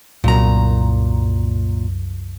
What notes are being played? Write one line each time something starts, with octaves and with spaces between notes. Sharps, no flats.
C2 F#2 A#2 A#5